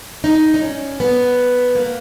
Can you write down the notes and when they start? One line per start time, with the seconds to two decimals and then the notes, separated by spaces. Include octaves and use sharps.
0.24 D#4
0.54 D#4
0.62 C#4
1.00 B3
1.75 A#3